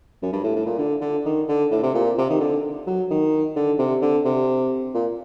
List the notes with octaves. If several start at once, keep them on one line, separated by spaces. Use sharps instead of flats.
F#2
G2
A2
A2
A#2
D3
D3
D#3
D3
A2
C3
A#2
C3
D#3
D3
F#3
D#3
D3
C3
D3
C3
A#2